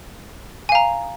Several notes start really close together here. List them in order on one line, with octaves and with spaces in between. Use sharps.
G#5 F5 A#5